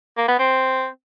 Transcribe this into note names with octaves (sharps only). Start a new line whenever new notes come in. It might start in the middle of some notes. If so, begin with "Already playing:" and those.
A#3
B3
C4